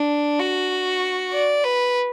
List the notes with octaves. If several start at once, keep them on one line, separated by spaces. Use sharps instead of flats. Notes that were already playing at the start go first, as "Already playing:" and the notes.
Already playing: D4
F#4
D5
B4